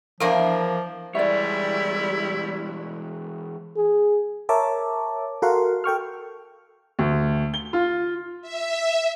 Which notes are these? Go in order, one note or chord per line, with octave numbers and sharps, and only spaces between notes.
E2 F3 A#3 D4
E3 G3 G#3 E4 C#5 D5 E5
G#4
A#4 C#5 E5 A5 D6
F#4 A4 A#4 F5 F#5 C6
A4 G5 C#6 F6
D2
G7
F4
E5